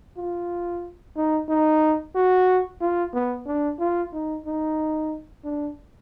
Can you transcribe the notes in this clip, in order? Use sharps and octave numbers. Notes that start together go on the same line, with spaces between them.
F4
D#4
D#4
F#4
F4
B3
D4
F4
D#4
D#4
D4